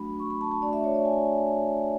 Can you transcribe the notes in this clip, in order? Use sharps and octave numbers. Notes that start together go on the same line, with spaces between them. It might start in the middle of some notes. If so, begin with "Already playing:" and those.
Already playing: F#3 A3 D4 F#4 B5
C#6
B5
A5
A5
A3 D4 F#4 D5
E5
C#5
D5
G#5